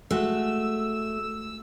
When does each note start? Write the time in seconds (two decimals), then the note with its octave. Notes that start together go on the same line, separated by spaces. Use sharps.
0.11 G#3 A3 F#4 E6